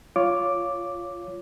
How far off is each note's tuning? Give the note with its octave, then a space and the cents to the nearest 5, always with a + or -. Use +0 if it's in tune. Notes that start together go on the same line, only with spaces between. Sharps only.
F4 +0 C#5 +10 D6 +0